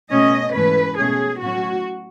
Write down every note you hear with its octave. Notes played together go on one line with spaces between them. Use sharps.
B2 A3 C#4 D#5
G#2 E3 A3 C#4 B4
B2 A3 C#4 G#4
A2 F#3 C#4 F#4